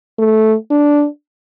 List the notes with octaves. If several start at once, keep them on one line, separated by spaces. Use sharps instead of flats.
A3
D4